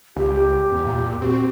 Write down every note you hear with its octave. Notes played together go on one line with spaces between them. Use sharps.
C#2 G4
E2
A#2
C4 F#4